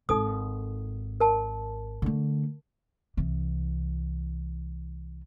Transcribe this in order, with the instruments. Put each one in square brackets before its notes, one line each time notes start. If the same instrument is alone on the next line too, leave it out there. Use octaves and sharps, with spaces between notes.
[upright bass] G#1 [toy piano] D#4 A4 D#6
[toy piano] A#4 A5
[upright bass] D3 A3
C2 E3